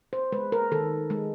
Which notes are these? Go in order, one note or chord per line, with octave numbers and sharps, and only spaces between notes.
C5
G#3 B4
A#4
D#3 A4
G#3